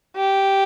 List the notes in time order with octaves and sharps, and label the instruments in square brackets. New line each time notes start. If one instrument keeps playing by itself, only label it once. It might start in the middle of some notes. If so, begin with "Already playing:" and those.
[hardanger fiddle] G4